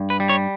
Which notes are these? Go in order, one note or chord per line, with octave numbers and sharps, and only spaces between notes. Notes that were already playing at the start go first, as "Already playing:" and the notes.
Already playing: G2
B4
G3
C#5